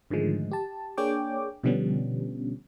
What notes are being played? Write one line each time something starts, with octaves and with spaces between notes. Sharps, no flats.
G#2 D3 D#3 F3 G#3 A3
G4 A5
A#3 D4 G#4 C#5 G5 D6
B2 D3 F3 G3 B3 C#4